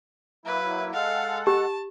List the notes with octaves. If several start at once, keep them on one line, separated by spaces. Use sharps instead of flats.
F#3 A#3 E4 B4
G#3 A4 F5 F#5
G4 A5